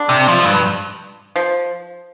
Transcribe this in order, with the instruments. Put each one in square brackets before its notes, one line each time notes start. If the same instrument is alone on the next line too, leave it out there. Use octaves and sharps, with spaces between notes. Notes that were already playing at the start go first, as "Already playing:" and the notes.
Already playing: [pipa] D3 D4
[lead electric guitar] C3
F3
G2
[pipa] F3